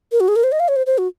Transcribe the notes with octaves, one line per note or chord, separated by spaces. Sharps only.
A#4
F#4
G#4
A#4
C5
D#5
F5
C#5
C5
C5
F#4